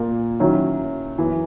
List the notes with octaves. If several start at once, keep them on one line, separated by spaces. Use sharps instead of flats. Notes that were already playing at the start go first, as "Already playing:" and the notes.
Already playing: A#2 A#3
D#3 F#3 C#4 E4
F#2 E3 B3